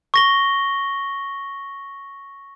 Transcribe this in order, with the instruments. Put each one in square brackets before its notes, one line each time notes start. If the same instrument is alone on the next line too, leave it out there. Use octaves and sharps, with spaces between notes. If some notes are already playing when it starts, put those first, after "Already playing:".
[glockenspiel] C#6 A#6 G7